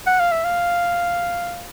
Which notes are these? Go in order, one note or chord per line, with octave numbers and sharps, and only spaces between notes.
F#5
F5
E5
F5